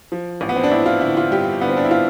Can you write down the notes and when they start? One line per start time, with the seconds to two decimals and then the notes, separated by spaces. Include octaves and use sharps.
0.12 F3
0.41 A1
0.49 B3
0.56 C4
0.64 D4
0.71 A1 E4
0.86 F4
1.01 D3 E4
1.17 F4
1.31 G2 G4
1.61 D3 B3
1.69 C4
1.77 D4
1.85 E4
1.91 F4